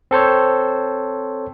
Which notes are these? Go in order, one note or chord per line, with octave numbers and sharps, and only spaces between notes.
C4 A4 C5 C#5